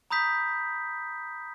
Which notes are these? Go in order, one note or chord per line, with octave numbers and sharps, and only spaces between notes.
A#5 B5 D#6 G6 B6